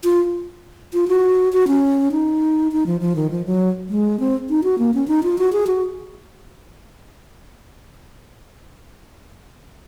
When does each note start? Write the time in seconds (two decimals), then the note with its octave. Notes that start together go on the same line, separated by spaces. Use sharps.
0.04 F4
0.94 F4
1.08 F#4
1.53 F#4
1.68 C#4
2.12 D#4
2.72 D#4
2.86 F3
3.01 F3
3.16 D#3
3.31 F3
3.46 F#3
3.89 G#3
4.20 C4
4.50 D#4
4.64 F#4
4.78 A#3
4.94 C#4
5.08 D#4
5.23 F4
5.38 F#4
5.53 G#4
5.67 F#4